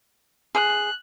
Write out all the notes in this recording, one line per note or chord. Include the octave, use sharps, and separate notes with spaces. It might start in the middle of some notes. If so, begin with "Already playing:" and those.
G#4 F#6